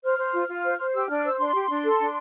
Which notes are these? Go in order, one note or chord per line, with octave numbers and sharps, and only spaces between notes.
C5 F6
C5
F4
F4
C5
C5
G4 E6
D4 F6
F6
C5 E6
D4 C6
G4
D4
A4
D4